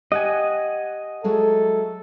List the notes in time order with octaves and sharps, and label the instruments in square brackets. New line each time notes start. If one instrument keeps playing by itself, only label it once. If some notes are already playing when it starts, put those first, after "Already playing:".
[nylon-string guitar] G4 [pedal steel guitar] D#5 F#5 G#5
[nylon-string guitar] F#3 G#3 A3 [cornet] A4